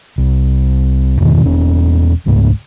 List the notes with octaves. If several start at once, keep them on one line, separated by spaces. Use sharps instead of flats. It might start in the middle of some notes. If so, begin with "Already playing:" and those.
C2
E2 G2 B2 D#3
E1 C#4
E1 C#2 G#2 A3